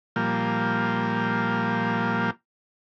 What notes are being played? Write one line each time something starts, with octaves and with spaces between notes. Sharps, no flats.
A#2 F3 G3 A#3